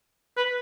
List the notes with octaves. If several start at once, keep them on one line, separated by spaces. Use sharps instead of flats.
B4